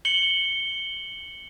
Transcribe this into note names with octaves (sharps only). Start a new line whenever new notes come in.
C#7 F#7 G7